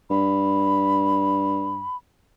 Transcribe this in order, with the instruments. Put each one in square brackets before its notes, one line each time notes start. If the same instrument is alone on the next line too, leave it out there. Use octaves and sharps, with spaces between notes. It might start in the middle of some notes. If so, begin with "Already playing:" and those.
[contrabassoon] G2 [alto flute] B5